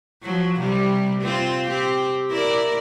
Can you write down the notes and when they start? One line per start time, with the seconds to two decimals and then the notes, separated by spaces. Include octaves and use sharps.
0.23 F3 F#3
0.60 C3 G3
1.22 C4 F4
1.67 C4 G4
2.30 E4 A#4 D5